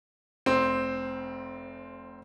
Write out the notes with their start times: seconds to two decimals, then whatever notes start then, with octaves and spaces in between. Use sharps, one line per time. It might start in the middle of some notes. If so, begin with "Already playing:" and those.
0.46 F1 C4 C6